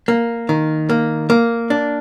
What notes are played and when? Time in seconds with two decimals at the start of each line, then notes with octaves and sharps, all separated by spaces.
0.08 A#3
0.49 D#3
0.90 A#3
1.30 A#3
1.70 D4